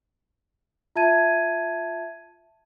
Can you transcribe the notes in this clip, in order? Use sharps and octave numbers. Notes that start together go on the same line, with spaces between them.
F4 E5 A5 G#6 D#7